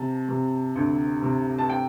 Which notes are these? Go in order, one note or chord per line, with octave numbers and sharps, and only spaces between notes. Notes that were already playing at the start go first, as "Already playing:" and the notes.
Already playing: C3 A5
C3
D2
C3
A5
G5